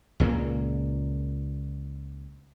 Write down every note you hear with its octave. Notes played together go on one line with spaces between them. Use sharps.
C#2 A#2 C#3 A#3